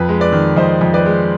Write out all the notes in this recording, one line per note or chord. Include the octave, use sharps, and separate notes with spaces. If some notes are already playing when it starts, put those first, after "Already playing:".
Already playing: F2 B4
G#3
B4 D5
D#3
F2 C5 D#5
F2
B4 D5
G#3